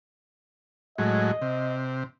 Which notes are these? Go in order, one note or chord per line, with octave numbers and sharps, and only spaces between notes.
A2 F#3 G#3 D#5
C3